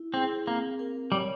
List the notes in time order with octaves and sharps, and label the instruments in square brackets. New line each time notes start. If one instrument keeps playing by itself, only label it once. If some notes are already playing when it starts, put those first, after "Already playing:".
Already playing: [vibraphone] E4
[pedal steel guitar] C4 [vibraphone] G#4
[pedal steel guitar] A#3 [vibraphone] C4
[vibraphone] A#4
[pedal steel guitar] G3 [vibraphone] C#5